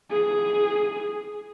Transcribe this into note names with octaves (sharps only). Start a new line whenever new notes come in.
G#4